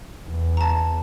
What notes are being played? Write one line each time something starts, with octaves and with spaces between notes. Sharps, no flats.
E2
A5 A#5